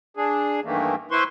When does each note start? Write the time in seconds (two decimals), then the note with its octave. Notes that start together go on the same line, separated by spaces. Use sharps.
0.17 D4 G#4
0.64 G2 D#3 E3 A3 A#3
1.11 E4 B4 C5 C6 C#6